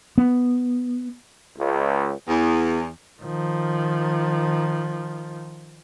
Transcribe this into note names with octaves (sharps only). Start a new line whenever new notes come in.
B3
C#2
E2
D#3 F3